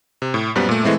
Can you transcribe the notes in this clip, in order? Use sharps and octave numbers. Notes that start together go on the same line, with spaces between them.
C3
A2
F#2 A#2 G3 B3 B4 C5
A#2 A3
E3 G#3 A3 C4 E4